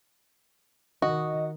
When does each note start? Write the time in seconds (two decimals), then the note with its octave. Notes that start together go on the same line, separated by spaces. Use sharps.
1.02 D#3 F#4 D#5